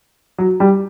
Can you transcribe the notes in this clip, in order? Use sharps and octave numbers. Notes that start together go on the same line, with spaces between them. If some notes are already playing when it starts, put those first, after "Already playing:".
F#3
G3